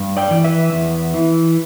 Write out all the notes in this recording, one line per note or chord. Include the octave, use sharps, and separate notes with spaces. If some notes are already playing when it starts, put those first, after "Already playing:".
Already playing: G2
D5 G5
E3
B4 E5
E2
E3